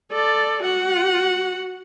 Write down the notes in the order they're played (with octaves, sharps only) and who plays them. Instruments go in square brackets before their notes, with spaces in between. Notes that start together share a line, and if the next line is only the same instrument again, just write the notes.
[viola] A4 D5
F#4 F#5